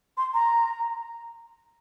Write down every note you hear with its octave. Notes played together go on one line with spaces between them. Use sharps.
C6
A#5